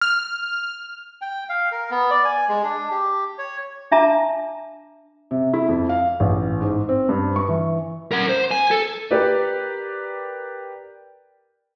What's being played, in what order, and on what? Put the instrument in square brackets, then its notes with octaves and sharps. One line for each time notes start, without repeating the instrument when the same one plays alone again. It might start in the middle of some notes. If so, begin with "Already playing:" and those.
[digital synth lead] F6
[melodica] G5
F5
A#4
B3
D5
G#5
G#3
D4
G4
C#5
[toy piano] D4 E5 A5 A#5 D6
[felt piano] C3
E4
F2
F5
A1
G#2
C4
G2
C#6
E3
[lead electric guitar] A#4 F#5
C5
G#5
A4
[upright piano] G4 A#4 B4 D5